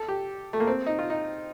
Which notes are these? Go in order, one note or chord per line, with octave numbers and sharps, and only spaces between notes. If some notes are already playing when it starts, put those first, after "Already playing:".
Already playing: A4
G4
A3
A#3
C4
D#4
F4
D#4